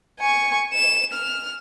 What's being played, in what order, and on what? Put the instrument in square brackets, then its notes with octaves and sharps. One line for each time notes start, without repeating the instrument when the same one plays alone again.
[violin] G#5 C#6
E7
F6